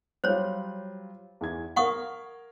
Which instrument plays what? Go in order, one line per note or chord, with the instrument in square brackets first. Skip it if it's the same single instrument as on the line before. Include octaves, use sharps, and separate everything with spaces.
[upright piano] F#3 G3 F4 [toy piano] C5 C#5
[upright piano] E2 E3 G#6
[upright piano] A#4 F5 [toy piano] F#5 C#6 D#6